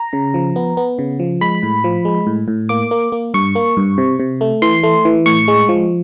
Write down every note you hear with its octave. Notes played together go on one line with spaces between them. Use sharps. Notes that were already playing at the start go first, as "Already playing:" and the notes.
Already playing: A#5
C#3
F3
B3
B3
C#3
F3
G#3 B5
A2
F3
G#3
A2
A2
A#3 D6
A#3
A#3
G2 C#6
A#3
G2
C3
C3
A3
E3 C6
A3
E3
A2 C#6
G#3
F3